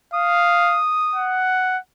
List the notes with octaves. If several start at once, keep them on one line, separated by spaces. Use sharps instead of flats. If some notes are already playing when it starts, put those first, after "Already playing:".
F5 D#6
F#5